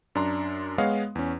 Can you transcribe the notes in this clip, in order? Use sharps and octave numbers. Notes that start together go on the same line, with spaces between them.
F#2 D4 A#5 C6
G#3 B3 C#5 D#5 F5 F#5
E2 C#4